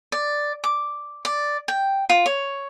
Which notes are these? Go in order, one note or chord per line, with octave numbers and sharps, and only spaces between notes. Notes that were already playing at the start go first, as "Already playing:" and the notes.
D5
D6
D5
G5
F4
C#5